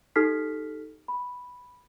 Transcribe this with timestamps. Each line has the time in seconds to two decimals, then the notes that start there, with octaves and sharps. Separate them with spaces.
0.16 D#4 G4 A4 F6 B6 C7
1.08 B5